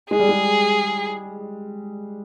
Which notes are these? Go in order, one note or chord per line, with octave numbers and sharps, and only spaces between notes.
G#3 G#4
G3
G#3